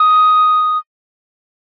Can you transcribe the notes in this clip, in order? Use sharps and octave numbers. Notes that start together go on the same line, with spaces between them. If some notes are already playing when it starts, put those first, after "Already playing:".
Already playing: D#6